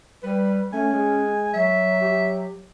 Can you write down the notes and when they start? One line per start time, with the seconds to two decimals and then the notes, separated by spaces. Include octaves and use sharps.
0.23 G3 B4
0.73 A3 C#4 G#5
0.92 G#3
1.54 F#3 E5
2.01 G4